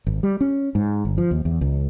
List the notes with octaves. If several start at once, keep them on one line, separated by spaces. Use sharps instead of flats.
G#1
G3
C#4
G#2
G1
F3
D#2
E2
C#2